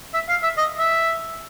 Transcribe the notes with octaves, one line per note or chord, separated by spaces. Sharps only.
E5
F5
E5
D#5
E5